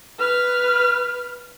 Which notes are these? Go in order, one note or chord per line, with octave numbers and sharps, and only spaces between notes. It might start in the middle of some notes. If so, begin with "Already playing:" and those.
B4 F6